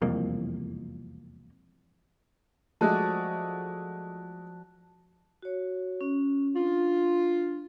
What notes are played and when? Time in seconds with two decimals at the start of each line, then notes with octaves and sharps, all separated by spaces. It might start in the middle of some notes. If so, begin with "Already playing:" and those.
0.02 E1 C2 F2 A#3
2.81 F3 G#3 A3 F#4 D5 A5 F#6
5.42 F#4 C#5
6.01 C#4
6.56 D4 F4